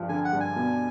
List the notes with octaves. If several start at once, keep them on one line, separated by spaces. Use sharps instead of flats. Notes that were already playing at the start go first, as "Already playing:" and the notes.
Already playing: G2 F3
D3 G#5
F#5
G2
G#5
B2